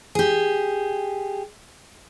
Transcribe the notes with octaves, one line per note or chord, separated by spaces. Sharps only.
G4 G#4